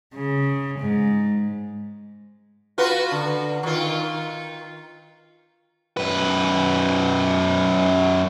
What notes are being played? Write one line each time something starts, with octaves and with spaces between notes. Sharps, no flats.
C#3
G#2
F4 F#4 B4
D3
D#3 F4
F#2 B4